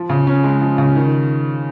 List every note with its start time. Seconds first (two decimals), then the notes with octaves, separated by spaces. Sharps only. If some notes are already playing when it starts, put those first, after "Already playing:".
Already playing: F3
0.10 C#3
0.27 C#4
0.44 G#3
0.61 F3
0.78 C#3
0.96 D#3